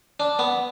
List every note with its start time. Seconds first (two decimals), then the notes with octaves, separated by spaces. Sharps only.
0.20 D4
0.39 B3